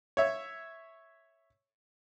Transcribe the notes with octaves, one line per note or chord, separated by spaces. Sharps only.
C#5 E5